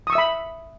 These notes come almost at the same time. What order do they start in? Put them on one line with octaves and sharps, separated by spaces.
D#6 C#6 E6 E5 B5